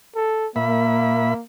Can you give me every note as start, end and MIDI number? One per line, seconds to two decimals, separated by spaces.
0.16 0.47 69
0.56 1.34 46
0.56 1.42 58
0.56 1.34 76
0.56 1.34 83